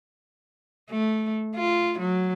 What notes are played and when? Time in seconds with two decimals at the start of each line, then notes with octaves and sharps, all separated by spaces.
0.91 A3
1.55 F4
1.99 F#3